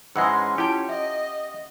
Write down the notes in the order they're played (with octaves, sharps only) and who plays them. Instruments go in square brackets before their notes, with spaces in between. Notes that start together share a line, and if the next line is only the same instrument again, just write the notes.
[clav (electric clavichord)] G#2 E3 G#3 [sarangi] C#4 [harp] F#5 C6 [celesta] E6 A#6
[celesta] E4 F4 A5 [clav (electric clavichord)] G4 G5
[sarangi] D#5 [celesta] E5